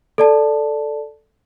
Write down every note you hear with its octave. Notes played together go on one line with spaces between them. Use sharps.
A4 D5 A5